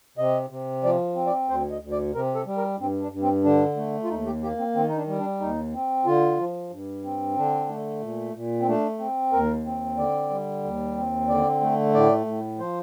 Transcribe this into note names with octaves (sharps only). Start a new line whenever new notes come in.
C3 D#5
C3
F3 D5
C4
D5
D2 C5
D#5
D2
D5
C3 A#4
A4
G3
A#4
G2 C4
D4
G2
C4
D3 D4
A3
F4
D#2 D#4
G4
A#3 G4
C4
D#3 C4
D#4
D4
G3
D4
D#2 D#4
C4
D3 F4
F3
G2
C4
D3 D4
A3
A#2
A#2
C4
A3 D4
C4
D#2 A#4
C4
D3 D5
G3
D#2
C4
D3 D5
A3
A2 D5
A2
F3 C5